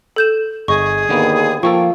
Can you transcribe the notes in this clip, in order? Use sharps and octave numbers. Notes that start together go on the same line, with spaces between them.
A4 G6 E7
G1 G#4 D#5 C#6
D#2 D3 A#3 B3
F3 A#3 F4 A4 G5 C#6